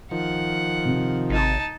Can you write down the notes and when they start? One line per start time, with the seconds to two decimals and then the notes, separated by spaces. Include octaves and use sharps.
0.11 D#3 F3 F#5
0.85 C3
1.30 G#1 D#4 A5